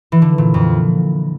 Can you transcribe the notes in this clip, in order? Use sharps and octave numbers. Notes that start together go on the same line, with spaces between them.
E3
D3
A#2
F2